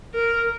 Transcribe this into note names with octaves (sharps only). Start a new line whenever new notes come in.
A#4